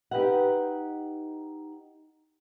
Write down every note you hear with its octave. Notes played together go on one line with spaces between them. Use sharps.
D#4 G4 B4 E5 F#5